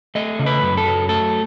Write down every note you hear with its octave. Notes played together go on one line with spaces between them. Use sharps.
A3 D#5
C#3
B4
F#2
A4
F#3
A3 A4